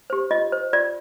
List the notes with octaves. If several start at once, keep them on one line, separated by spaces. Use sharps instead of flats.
G4 C5
F4 D#5
C5
F4 D5